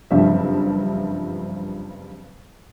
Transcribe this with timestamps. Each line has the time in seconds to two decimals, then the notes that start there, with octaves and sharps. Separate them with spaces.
0.11 F#1 G2 F3 C4 E5